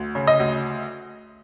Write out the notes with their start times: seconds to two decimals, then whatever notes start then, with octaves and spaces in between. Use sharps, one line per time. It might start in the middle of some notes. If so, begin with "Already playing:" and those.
Already playing: D2
0.15 C#3
0.27 D#5
0.40 D2